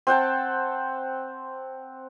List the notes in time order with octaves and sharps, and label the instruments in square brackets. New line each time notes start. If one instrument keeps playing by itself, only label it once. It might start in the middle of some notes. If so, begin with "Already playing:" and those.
[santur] C4 F#5 G5 A5